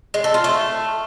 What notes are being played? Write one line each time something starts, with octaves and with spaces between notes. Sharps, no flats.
G#3
A4
F4
A3